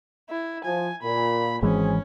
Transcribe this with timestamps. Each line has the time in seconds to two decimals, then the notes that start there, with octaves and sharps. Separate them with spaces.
0.30 E4
0.65 F3 G#5
1.03 A#2 B5
1.62 G#1 F#2 E3 G#3 C4 C#4 G#4